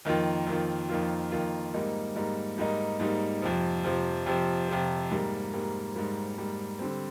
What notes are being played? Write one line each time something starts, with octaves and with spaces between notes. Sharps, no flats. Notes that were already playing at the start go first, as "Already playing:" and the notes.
F2 D#3 A#3 F4
F2 D#3 A#3 F4
F2 D#3 A#3 F4
F2 D#3 A#3 F4
G#2 G3 A#3 D#4
G#2 G3 A#3 D#4
G#2 G3 A#3 D#4
G#2 G3 A#3 D#4
F2 C3 F3
F2 C3 F3
F2 C3 F3
F2 C3 F3
G#2 G3 A#3
G#2 G3 A#3
G#2 G3 A#3
G#2 G3 A#3
D3 G3 C4